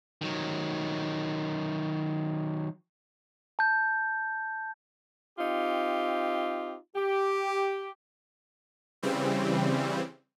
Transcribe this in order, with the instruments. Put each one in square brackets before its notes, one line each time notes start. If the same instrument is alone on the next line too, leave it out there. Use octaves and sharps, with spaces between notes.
[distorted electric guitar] D#3 F#3
[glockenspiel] A5 G6
[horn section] C4 D#4 F4 G4
G4
[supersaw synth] C#3 E3 G3 C4